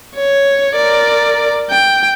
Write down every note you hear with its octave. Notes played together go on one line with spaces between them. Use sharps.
C#5
A#4 D5
G5